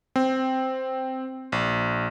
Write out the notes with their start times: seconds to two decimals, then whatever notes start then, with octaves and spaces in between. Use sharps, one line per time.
0.16 C4
1.52 A#1